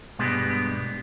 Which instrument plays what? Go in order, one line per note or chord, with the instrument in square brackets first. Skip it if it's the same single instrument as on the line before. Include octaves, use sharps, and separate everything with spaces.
[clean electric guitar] G2 B2 G3 G#3 B3 D4